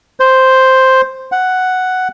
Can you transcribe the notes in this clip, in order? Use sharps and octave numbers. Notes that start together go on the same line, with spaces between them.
C5
F#5